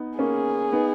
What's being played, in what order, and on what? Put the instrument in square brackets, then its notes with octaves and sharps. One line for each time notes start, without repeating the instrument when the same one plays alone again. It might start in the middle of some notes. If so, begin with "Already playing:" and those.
Already playing: [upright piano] B3 D#4
[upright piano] A#3 C#4 [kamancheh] G#4
[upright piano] B3 D#4